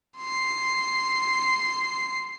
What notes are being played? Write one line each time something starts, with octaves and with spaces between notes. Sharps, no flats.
C6 C7